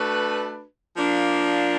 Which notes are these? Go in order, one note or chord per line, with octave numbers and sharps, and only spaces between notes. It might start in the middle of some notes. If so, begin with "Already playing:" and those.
Already playing: A3 D4 F#4 B4
F3 A#3 D4